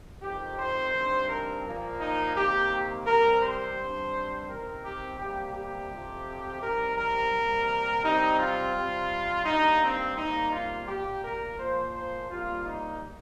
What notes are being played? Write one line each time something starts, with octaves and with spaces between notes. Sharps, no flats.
F2 D#3 C4 G4
C5
G2 D#3 C4
A#4
A#2 F3 A#3
D#4
C3 D#3 A#3 G4
C3 G3 C4 A#4
C5
G2 G3 C4
C3 D#3 C4 A#4
G4
C3 G3 A#3 G4
G4
F2 C3 F3 C4
C3 D#3 G3 C4 A#4
A#4
C3 G3 A#3
C3 G3 C4 D#4
F4
C3 G3 C4
G2 G3 A#3 D#4
C4
C3 G3 A#3 D#4
F4
A#2 A#3 G4
A#4
A#2 F3 A#3 C5
C5
C3 G3 A#3 F4
D#4